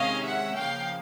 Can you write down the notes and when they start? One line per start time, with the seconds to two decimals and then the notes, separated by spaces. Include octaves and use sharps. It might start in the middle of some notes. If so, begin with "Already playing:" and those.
Already playing: C3 D#3 G#3 C#4 D#5 F5
0.24 E5 F#5
0.56 C#3 F3 A#3 F5 G5